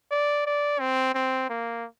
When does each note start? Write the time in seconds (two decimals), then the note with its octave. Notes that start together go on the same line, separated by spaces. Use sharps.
0.11 D5
0.46 D5
0.80 C4
1.15 C4
1.50 A#3